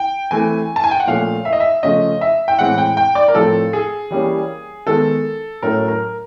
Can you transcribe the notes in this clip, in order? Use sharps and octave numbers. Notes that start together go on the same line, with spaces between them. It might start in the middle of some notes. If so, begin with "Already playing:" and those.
Already playing: G5
E3 A3 C4 G#5
A5
G#5
G5
F#5
A#2 F3 A3 C#4 F5
E5
D#5
E5
C#3 F3 A3 C#4 D#5
E5
G5
A2 E3 G#3 C4 F#5
G5
G5
D5
A#4
A2 F3 A3 C4 A4
G#4
E3 G3 A#3 C#4
D#3 G#3 B3 A4
A2 F#3 A3 C#4 A#4
A#4